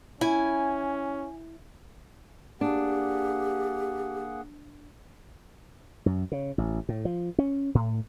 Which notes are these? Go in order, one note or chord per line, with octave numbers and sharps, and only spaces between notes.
C#4 E4 G#5
A#3 D4 G4 G#4 F#5
F#2
C#3
A1
A2
F3
C#4
A2